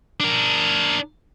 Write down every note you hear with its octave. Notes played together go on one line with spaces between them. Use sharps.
D4 A#4